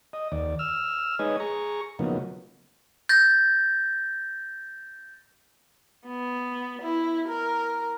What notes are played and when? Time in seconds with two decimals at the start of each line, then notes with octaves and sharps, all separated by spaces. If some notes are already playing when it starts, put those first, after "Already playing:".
0.13 D#5
0.32 D#2 D5
0.59 E6 F6
1.19 G#3 D#4 B4 C#5 D#5 G#5
1.40 G#4 A#5 C#6
1.99 C#3 F3 F#3 A#3 B3 D#4
3.09 G6 A6 A#6
6.07 B3
6.82 E4
7.28 A#4